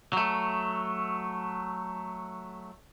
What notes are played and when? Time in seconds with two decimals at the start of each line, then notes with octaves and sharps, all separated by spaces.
0.13 F#3 A3